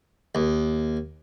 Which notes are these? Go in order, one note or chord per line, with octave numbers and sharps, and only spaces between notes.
D#2